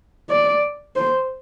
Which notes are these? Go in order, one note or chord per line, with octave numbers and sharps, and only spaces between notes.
D5
C5